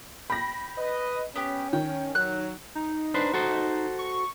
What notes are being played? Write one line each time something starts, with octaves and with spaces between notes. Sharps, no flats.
G5 B5 A#6
B4 D#5
B3 C#4 G4
D#3 G5
F#3 F#6
D#4
D4 B4 C5
F#4 A4 C5
C#6